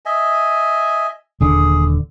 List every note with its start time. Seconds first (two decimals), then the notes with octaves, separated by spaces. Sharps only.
0.06 D#5 E5 G#5
1.41 D#1 D3 G#4